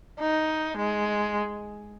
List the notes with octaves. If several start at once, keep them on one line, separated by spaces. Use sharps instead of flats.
D#4
G#3